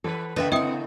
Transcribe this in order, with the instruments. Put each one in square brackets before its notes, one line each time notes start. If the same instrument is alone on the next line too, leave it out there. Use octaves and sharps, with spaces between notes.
[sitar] E3 B4 [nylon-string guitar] A4
[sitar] A2 C#3 A#3 [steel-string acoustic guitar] B4 E5 G5
[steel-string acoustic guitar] C4 F#5 [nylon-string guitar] E4 [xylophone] D#5 G5 D#6